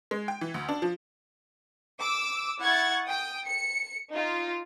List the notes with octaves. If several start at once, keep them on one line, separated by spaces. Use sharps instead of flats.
G#3
G5
E3
D2
D4
F3
D6 E6
E4 F#5 C#6 G#6 A6
G5 D#6
C#7
D#4 F4